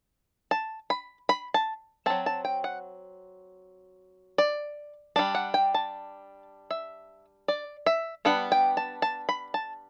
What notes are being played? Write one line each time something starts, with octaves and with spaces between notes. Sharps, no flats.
A5
B5
B5
A5
F#3 C4 A5
A5
G5
F#5
D5
G3 D4 A5
F#5
G5
A5
E5
D5
E5
G3 B3 D4 F#5
G5
A5
A5
B5
A5